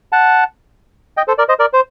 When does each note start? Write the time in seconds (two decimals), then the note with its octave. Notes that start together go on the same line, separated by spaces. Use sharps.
0.12 F#5 A5
1.17 D#5 G5
1.28 A4 C5
1.38 A#4 D5
1.49 C5 D#5
1.59 A#4 D5
1.73 C5